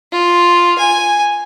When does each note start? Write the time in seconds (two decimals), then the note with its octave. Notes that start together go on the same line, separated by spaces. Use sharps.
0.12 F4
0.78 G#5